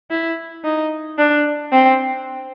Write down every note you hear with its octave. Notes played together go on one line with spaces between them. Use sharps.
E4
D#4
D4
C4